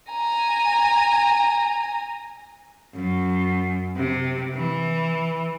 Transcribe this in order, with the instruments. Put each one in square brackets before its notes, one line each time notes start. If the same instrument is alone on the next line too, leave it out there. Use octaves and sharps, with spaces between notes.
[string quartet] G#5 A#5
[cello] F#2
C3
E3